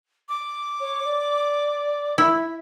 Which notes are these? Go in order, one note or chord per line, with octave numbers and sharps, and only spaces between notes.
D6
C#5
D5
E4 E5